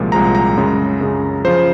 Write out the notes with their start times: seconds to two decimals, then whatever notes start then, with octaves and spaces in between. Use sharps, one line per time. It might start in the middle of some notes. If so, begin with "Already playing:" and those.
Already playing: C2 A#2 F3 G#3
0.12 C2 A#2 F3 G#3 A#5
0.35 A#5
0.57 F#2 C#3 G#3
1.01 F#2 C#3 G#3
1.44 C#3 F3 C5